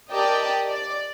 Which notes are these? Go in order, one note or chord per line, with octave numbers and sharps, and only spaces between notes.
G4 A#4 D5 D#5 G5 A5
D5